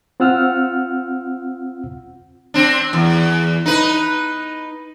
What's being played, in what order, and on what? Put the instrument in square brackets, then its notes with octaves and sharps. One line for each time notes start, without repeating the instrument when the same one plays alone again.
[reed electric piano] C4 F4 F#5 E6 F6
[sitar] C4 D4
E2
D#4 B4